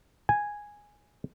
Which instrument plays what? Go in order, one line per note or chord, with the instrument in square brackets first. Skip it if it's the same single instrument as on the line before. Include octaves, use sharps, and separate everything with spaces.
[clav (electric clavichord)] G#5